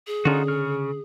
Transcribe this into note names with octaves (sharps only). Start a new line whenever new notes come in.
G#4
D3 C#4 D#4 F4 F#4
C#3 C#6 F6